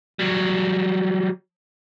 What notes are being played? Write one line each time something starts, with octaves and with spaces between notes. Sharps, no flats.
F#3 G3